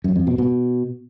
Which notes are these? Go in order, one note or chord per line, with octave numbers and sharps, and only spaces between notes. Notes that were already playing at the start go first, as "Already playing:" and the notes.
F#2
F2
B2
B2